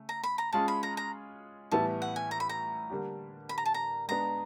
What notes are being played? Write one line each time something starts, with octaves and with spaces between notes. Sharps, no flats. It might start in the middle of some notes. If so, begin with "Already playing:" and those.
Already playing: C#3 A3
A#5
B5
A#5
G#3 C#4 F4 G#4 A5
B5
A#5
A#5
A2 E3 G3 B3 E4 A5
F#5
G#5
A#5
B5
A#5
D3 G3 A#3 D4 G4
B5
A#5
A5
A#5
G#3 B3 D4 A#5